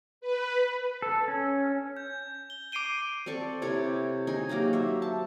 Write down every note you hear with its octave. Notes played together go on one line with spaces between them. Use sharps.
B4
A4
C#4
G6
G7
D6 C7 D7 D#7 G7
C4 A4 D5 C#6
C3 E4 C#5
D#4 G#4 G5
F#3 A#3 F#4 G4
C5 E5
A5